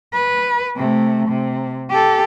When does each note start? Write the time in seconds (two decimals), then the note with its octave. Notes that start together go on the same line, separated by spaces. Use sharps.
0.13 B4
0.76 C3 A3
1.29 C3
1.90 G4 A4